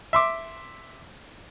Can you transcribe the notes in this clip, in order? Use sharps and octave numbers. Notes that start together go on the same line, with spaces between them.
E5 C6 D6